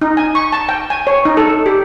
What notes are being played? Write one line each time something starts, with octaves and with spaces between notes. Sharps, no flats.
D#4
G#5
C#6
A5
G5
G#5
C#5
D#4
A4
G4